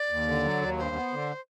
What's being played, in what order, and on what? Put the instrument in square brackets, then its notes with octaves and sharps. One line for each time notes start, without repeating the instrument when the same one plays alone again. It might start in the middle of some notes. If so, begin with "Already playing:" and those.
Already playing: [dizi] D5
[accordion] D#2
D3
F#3
D#2
[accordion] G2 [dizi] C5
[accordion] B3
D3